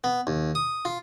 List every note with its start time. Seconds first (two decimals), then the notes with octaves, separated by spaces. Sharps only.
0.04 B3
0.27 D#2
0.55 D#6
0.85 F4